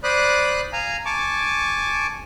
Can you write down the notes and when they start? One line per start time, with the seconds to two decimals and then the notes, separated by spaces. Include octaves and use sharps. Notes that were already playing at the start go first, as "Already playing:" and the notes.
0.03 C5 D5 B5 D#6 F#6
0.73 F5 G#5 A#5
1.05 G#5 A5 C#6 D6